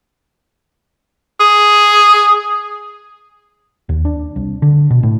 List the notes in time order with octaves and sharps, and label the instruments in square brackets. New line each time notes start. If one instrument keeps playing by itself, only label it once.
[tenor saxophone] G#4
[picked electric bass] D#2
D4
C2
D3
B2
A2